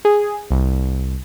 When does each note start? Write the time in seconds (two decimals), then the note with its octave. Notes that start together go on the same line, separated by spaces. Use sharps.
0.05 G#4
0.51 C2